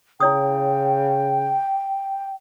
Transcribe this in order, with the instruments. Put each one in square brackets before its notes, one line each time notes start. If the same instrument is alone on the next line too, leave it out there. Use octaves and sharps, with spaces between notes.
[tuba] C#3 [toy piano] E4 C#5 D#6 [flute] G5